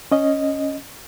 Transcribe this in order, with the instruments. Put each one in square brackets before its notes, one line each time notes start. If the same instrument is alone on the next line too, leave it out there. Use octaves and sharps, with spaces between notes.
[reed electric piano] C#4 D#5